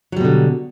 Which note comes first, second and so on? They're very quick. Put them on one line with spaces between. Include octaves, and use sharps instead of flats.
F#3 G3 B2 D3